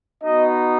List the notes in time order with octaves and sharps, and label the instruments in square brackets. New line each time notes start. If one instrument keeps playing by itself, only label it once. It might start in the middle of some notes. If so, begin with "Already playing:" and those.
[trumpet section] B3 D#4 F#4 D#5